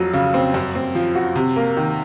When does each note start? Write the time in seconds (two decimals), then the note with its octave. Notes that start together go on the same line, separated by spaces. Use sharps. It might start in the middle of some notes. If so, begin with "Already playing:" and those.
Already playing: F2 F#3
0.14 C#3
0.34 C4
0.54 F#2
0.75 C4
0.95 F3
1.15 F#4
1.36 C3
1.56 A#3
1.77 D#3